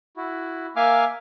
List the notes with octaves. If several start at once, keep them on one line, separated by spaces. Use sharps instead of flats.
E4 F#4
A#3 E5 F5 G#5 D6 F6